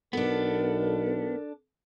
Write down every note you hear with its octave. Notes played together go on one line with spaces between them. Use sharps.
B1 B3 D4 A4 A#4